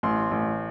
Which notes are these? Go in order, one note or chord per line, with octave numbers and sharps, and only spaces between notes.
A1 C6
A1